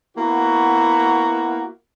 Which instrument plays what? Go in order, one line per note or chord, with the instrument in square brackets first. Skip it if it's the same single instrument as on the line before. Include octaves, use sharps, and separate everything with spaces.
[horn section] A#3 B3 E4 F#4